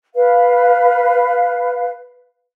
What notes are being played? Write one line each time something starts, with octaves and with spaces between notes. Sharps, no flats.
B4 F5